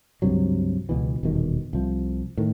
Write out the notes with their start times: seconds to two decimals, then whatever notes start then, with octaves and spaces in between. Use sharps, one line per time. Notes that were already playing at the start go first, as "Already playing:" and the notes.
0.22 C#2 G2 C3 F#3
0.89 C#2 B2 E3
1.23 D#1 E2 B2 D#3
1.73 C2 F3
2.38 A2 D#3